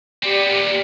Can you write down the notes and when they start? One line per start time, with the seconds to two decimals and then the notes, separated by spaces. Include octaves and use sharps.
0.23 B3 C4 G4 D5
0.50 D#2 A#2